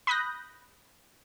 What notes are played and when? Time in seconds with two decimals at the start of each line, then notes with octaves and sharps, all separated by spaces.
0.07 B5 D#6 F#6 G6 A#6